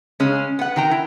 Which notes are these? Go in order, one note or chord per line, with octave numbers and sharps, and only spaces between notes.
C#3 G#3 C#4
B3 F#5
D#3 A#4 G5 A#5
E4